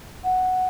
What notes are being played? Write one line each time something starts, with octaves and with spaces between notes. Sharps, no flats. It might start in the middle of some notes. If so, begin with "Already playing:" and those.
F#5